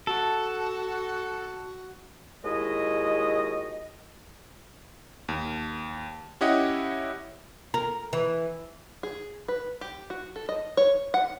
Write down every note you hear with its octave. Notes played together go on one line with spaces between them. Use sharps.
F#4 A4
D#2 G#3 E4 F#4 D#5
D#2
C#4 E4 G4 D#5 F#5
A#4
E3
G#4
B4
G4
F#4
A4
D#5
C#5
F#5